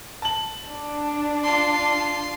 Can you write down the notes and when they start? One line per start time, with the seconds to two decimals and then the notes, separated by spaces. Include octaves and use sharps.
0.22 A5 F#7
0.70 D4
1.43 F4 C6